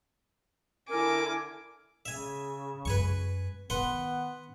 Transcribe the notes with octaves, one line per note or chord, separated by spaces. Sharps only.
D3 E4 A#4 G#5 D6
C#3 E5 G#5
F#2 G#3 B4 G#5 C#6
D#3 B3 B4 F#5 C6